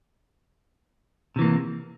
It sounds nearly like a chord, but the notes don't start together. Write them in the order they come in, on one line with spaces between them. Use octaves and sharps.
C3 E3 A#3